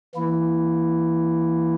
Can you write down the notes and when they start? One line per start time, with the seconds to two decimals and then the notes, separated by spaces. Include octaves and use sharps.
0.15 E3 A#3 E4